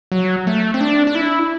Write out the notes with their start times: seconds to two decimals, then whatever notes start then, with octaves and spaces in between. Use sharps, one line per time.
0.12 F#3
0.47 A3
0.74 C4
0.81 D4
1.07 D4
1.15 E4